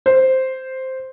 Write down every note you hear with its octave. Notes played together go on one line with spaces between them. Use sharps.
C5